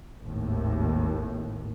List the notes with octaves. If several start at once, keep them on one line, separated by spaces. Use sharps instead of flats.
G#1 D#2 A2